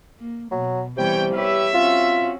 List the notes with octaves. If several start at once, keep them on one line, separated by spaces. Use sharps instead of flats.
A#3
B2 F#3
C3 E3 G3 B3 C#5 G5
G4 B4 C#5 E5
C4 C#4 F4 F#4